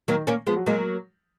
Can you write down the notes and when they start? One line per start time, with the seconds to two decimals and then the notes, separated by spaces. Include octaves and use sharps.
0.08 D#3 F#3 A#3
0.27 A#3 C#4
0.47 F3 G#3 B3
0.56 F#3
0.66 F#3 G#3 A#3